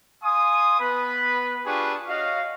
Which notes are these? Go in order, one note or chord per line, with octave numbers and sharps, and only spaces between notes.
F5 G#5 C6 D#6
B3 B4 B5
D4 F4 G4 G#4 B4 C#6
F#4 C#5 D#5 F5